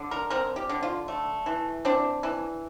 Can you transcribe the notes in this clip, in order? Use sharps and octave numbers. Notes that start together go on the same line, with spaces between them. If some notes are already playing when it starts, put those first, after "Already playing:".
Already playing: D3
A#4
C4 A#4
G4
D3
F4
A3
E3
C4 D4
E3